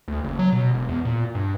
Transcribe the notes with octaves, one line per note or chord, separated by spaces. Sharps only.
D2
F#1
F#3
B2
E1
E2
A#2
G2